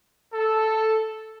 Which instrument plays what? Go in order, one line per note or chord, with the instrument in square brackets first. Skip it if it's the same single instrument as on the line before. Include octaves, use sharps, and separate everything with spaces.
[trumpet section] A4